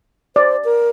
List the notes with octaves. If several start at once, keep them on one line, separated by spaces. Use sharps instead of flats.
C5 D5
A#4